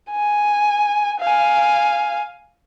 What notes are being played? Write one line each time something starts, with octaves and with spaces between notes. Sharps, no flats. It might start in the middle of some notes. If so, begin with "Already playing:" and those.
G#5
F5 G#5